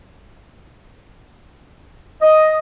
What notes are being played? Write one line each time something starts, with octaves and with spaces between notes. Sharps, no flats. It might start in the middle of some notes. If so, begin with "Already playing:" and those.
D#5